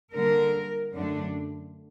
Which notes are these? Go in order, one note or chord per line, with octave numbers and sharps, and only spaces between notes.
D3 G3 A#3 A#4
F#2 D3 A3 D4